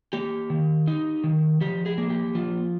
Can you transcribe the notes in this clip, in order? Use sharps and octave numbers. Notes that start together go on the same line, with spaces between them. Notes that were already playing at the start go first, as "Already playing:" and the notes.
A#3 G4
D#3
D#4
D#3
F3 G4
G#4
A#3
G4
F3 F4